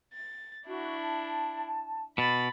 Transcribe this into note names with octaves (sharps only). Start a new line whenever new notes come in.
A6
D4 E4 F#4
A5
B2 B5 A6